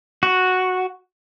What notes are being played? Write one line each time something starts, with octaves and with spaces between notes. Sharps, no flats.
F#4